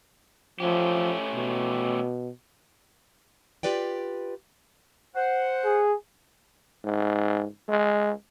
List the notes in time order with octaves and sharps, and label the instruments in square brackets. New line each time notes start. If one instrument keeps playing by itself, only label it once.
[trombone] F3 [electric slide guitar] A3 C#4 G4
[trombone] B2
[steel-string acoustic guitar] F4 G4 B4 D5 G5
[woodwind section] C5 F#5
[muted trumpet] G#4
[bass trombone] G#2
G#3